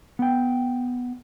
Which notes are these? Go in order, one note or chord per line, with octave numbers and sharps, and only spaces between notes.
B3 G5